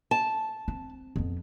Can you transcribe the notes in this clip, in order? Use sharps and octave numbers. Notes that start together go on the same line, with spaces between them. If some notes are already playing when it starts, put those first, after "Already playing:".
A5
C4
F2 B3